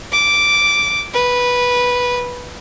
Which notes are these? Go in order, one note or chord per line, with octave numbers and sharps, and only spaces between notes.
D6
B4